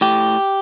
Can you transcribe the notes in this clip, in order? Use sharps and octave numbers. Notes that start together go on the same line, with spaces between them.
A2 G4